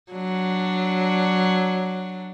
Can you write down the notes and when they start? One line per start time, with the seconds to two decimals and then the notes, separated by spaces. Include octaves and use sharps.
0.12 F#3 D4